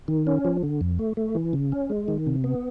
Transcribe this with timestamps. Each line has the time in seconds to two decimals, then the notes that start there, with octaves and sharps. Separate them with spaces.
0.08 D#3
0.27 C#4
0.45 F3
0.63 D3
0.81 F2
0.99 A3
1.17 A3
1.35 E3
1.53 C#3
1.72 C#4
1.90 G#3
2.08 D#3
2.27 C3
2.44 B3